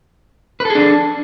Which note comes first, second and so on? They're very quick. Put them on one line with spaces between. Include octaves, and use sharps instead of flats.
B4 A4 G#4 D4